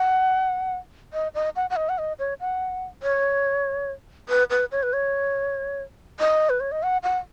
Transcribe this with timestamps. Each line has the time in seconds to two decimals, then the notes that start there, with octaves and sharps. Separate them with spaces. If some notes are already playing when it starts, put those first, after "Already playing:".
Already playing: F#5
1.13 D#5
1.35 D#5
1.56 F#5
1.70 F#5
1.76 D#5
1.89 F#5
1.98 D#5
2.19 C#5
2.40 F#5
3.03 C#5
4.29 B4
4.50 B4
4.72 C#5
4.83 B4
4.93 C#5
6.20 D#5
6.50 B4
6.60 C#5
6.72 D#5
6.83 F#5
7.03 F#5